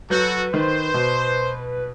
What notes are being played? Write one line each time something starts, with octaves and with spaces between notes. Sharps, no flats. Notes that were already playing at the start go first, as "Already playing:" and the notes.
F#3 F#4 A4 B4 G6
D#3 C5
B2